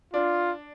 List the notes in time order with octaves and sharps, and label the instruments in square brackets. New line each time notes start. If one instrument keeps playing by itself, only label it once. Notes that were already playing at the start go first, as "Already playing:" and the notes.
[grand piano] D4 [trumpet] F4